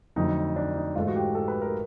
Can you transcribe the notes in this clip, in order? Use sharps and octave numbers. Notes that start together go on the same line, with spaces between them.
F2 D3 F#3 A3 D#4
D4
D#4
G#2 E3 A3 F4
F#4
G4
A4
B4
A#4